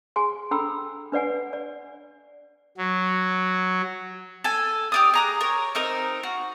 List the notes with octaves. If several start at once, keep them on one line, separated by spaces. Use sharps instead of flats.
G#4 G#5 C6
D4 A4 G5 A#5 B5 E6
D4 B4 D5 F#5 G#5
D5
F#3
A4 G#5
G4 D5 D#6
G#4 A#5 F#6
A#4 C#5
C4 D#4 A#4
F#4